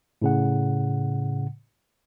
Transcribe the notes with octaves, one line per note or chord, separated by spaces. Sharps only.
A2 C#3 F#5